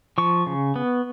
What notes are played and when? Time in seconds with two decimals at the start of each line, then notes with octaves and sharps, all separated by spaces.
0.18 F3 C#6
0.47 C#3
0.76 B3